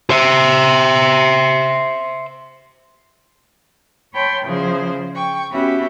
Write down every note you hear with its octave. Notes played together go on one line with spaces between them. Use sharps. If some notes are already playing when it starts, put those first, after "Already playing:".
C5 E5
C#5 G5 A5 B5 C6
E2 C#3 F3 G#4 C5
G5 C#6
B3 C#4 F#4 G4 E5 B5